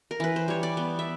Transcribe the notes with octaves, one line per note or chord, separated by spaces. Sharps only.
A#4
E3 B4
C5
G3 C#5
D5
B3
E5